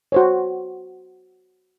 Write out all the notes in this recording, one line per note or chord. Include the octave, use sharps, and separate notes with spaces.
F#4 C5 C#5